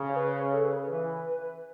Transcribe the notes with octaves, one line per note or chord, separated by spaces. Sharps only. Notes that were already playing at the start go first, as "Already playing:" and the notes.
Already playing: C#3
C#5
B4
C#5
A4
B4
E3